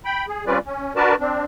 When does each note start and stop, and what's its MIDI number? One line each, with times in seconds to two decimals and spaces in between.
0.05 0.26 79
0.05 0.26 83
0.28 0.45 68
0.47 0.58 55
0.47 0.58 60
0.47 0.58 61
0.47 0.58 65
0.47 0.58 71
0.47 0.58 74
0.66 0.93 61
0.96 1.15 62
0.96 1.15 66
0.96 1.15 70
0.96 1.15 71
0.96 1.15 74
0.96 1.15 81
1.20 1.45 60
1.20 1.45 62